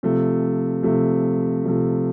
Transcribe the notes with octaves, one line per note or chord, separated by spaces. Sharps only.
C3 F3 A3
C3 F3 A3
C3 F3 A3